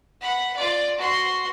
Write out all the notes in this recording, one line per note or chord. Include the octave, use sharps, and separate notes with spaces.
F#5 B5
F4 D5
F#4 C6